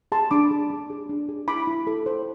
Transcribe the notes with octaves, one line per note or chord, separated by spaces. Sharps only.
G#4 A5 C6
D4 B5 D6
G#4
D4
G#4
D4
G#4
E4 B5 D6
E4
A4
C5